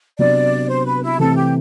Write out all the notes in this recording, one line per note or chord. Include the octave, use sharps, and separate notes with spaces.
C3 F#3 B3 D4 D5
C5
B4
E4
C3 E3 A3 C4 A4
G4